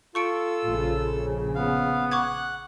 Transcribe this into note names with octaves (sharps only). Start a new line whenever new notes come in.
F4 A4 C#6 E6 C#7 D7
A#1 C#3
B3 F5
F#5 C#6 D6 F#6 G#6